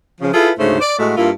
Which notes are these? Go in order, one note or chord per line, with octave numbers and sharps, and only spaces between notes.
C#3 F3
E4 F4 G#4 A4 B4
D2 G#2 C#3 A3 D#4 C5
D5
A2 G#3 A3 F#4
G2 A#3 E4 F4